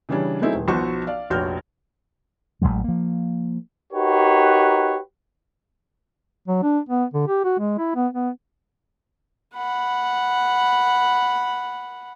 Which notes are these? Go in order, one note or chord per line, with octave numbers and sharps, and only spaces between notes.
C#3 E3 G3 C#4 D4
F#3 G#3 A3 C4 D#4 E4
D#1
B1 F3 B3 F#4 C5 C#6
D5 F5
F1 A#1 F#4 C#5 F6 G6
A1 C#3 F#3 G#3
F3 A#3
D#4 F#4 G4 A#4 B4 C#5
F#3
D4
B3
D3
G4
F#4
G#3
E4
B3
B3
F#5 B5